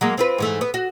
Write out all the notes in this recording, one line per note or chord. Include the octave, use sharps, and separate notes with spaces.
F#3 G#3 A#3
C4 F4 B4
G#2 E3 A3
B3
F#4